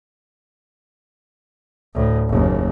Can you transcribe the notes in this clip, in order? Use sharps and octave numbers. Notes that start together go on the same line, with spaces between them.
D2 A2
F#1 D#2